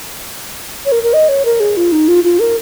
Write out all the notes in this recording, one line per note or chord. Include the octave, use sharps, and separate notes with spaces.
C#5
A#4
A#4
D#5
C#5
A#4
G#4
F4
D#4
F4
F4
A#4